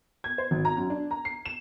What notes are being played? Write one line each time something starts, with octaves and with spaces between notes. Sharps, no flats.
G#6
C5
G#1
A#5
F#2
D4
A#5
C7
E7